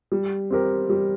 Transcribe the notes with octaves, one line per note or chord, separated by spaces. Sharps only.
G3
C4 G4 A#4
G3